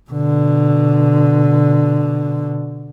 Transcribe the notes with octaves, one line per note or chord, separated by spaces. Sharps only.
B2 D3